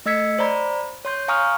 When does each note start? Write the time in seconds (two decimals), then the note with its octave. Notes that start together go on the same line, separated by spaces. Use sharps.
0.06 A3 D#5 E6 G#6 B6 C#7
0.39 C5 D5 A#5 B5
1.05 C#5 C6 G6
1.28 F5 G#5 A#5 C#6 D#6 F6